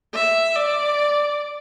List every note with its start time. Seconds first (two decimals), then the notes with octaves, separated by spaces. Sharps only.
0.14 E5
0.56 D5